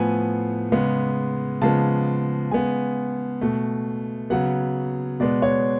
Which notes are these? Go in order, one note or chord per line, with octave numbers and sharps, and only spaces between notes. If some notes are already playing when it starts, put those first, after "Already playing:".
Already playing: A2 F3 B3 G#5
C#3 G#3 B3
C#3 F3 G#3 B3 A5
C#3 G#3 B3 G#5
B2 A3
C#3 F#3 B3 F#5
B2 G#3 B3 D5
C#5